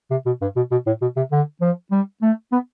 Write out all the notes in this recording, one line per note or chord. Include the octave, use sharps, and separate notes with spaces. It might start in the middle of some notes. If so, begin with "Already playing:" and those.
C3
B2
G2
B2
B2
A2
B2
C3
D3
F3
G3
A3
B3